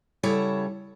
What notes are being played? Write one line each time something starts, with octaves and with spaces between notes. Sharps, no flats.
C#3 G3 E4 A4 C#5 F#5